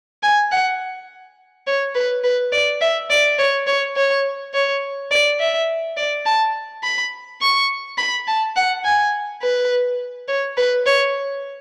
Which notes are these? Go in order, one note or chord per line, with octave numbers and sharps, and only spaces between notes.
G#5
F#5
C#5
B4
B4
D5
E5
D5
C#5
C#5
C#5
C#5
D5
E5
D5
A5
B5
C#6
B5
A5
F#5
G#5
B4
C#5
B4
C#5